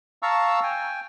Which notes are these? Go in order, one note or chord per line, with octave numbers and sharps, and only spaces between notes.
F5 A5 A#5 C#6 E6
G5 G#5